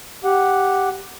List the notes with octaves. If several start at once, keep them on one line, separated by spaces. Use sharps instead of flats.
G4 F#5